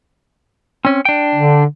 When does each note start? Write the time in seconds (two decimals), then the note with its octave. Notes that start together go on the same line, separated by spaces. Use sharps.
0.85 C4 C#4
1.05 D4 G5
1.35 D3